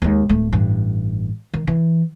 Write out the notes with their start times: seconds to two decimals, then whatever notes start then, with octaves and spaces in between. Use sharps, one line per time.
0.02 D#2 G#3
0.29 D1 A3
0.53 A1 G2
1.54 D#3
1.67 E3